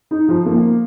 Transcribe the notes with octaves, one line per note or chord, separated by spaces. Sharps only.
D#4
F3
A#3